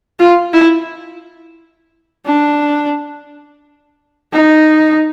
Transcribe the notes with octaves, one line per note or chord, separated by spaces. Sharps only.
F4
E4
D4
D#4